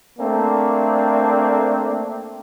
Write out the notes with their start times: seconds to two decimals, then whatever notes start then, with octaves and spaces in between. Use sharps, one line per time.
0.19 A3 A#3 C4 D4